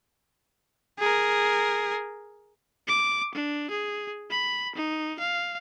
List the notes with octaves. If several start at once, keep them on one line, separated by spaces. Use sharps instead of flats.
G#4 A#4
D6
D4
G#4
B5
D#4
F5